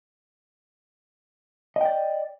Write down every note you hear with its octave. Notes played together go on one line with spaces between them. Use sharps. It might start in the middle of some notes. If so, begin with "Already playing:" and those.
D5 D#5 G5